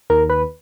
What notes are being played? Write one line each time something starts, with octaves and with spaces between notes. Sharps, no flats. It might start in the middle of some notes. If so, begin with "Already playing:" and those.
D#2 A#4
B4